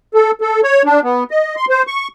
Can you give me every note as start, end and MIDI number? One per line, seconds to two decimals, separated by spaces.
0.14 0.31 69
0.41 0.60 69
0.63 0.83 73
0.85 1.00 62
1.03 1.24 59
1.31 1.55 75
1.56 1.65 84
1.69 1.83 72
1.87 2.08 85